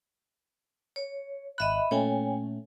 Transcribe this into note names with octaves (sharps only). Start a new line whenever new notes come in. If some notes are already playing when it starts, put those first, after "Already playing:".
C#5
G#1 D#5 E5 B5 F#6
A#2 A3 C#4 C#5 G5 G#5